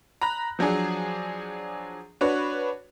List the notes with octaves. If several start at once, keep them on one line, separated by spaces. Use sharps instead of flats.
A#5 B5 F#6 A#6
F3 F#3 D4 G#4
D4 F#4 B4 C#5